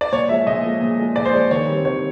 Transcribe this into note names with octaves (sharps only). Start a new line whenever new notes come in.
D5
A#2 C#5
F3 G#3 E5
A#2 D#5
F3 G#3
A#2
F3 G#3
A#2 D5
C5
F3 G#3 C#5
D#3 C#5
G3 C4
D#3 C#5